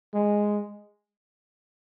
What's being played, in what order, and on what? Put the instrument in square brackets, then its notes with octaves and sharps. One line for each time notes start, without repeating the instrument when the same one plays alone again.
[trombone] G#3